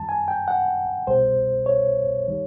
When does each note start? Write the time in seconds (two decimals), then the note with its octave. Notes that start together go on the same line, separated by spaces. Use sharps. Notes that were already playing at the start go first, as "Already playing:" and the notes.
Already playing: F#2 D#3 G3 A5
0.09 G#5
0.28 G5
0.48 F#5
1.07 C2 B2 G3 C5
1.66 C#5
2.28 D#3 G3